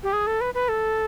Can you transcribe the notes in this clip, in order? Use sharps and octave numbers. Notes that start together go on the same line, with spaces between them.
G4
G#4
A4
B4
B4
A4